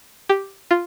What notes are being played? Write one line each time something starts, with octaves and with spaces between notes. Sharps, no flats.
G4
F4